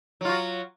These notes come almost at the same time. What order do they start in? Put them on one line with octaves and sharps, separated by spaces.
F#3 F4 F#4